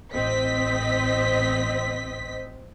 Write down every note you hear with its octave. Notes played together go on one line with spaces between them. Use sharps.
A1 C4 D#5 B6